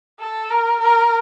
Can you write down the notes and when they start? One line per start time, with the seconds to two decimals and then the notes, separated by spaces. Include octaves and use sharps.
0.20 A4
0.50 A#4
0.80 A#4